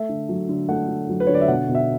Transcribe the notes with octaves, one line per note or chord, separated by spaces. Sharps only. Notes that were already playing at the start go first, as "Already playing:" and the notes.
Already playing: A3 E5
D3
F#3
D3
A3 F#5
D3
F#3
B4
D3 C#5
D5
E5
B2 F#5
B2
E5